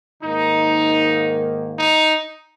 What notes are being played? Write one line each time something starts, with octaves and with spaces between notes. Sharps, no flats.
G#2 D#3 A#3 D#4
D#4